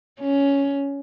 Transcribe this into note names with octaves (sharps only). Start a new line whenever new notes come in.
C#4